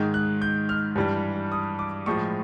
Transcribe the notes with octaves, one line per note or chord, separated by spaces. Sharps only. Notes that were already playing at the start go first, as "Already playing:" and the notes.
Already playing: G#2 D#3 G#3
F#6
G6
F6
G2 E3 G3
D#6
D6
A2 F3 G#3 C#6